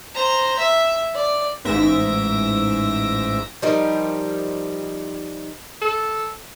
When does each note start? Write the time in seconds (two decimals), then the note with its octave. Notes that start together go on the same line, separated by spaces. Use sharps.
0.15 C5 A#5
0.58 E5
1.15 D5
1.65 A1 G#2 E5 A#6 D7
3.62 F3 G3 D#4 A#4
5.81 A4